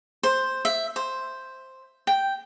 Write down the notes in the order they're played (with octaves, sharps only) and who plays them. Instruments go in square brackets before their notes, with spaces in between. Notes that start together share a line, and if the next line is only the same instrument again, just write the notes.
[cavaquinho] C5
E5
C5
G5